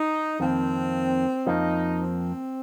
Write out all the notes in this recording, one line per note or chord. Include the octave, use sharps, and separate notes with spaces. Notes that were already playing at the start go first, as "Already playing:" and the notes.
Already playing: D#4
F2 D#3 A#3 C4
F2 F3 A#3 D#4
C4